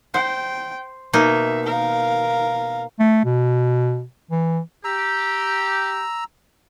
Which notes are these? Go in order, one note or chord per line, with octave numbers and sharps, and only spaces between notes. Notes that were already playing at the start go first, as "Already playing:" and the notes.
C5 G5
B2 A#3 D#4 E5
A#4 F5
A3
B2
E3
G4 A#5 E6